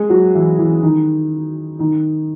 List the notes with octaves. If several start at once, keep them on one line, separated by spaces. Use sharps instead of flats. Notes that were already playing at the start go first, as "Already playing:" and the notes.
Already playing: G#3 G#4
F#3 F#4
E3 E4
E3 E4
D#3 D#4
D#3 D#4